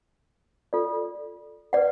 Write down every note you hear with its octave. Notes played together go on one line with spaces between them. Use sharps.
F4 A4 D5
B4 D5 F#5